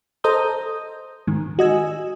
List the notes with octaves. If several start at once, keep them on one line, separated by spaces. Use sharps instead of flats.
A4 C5 D#5 A#5 D#6 G6
G#2 D#3
F#4 D#5 G#5 E6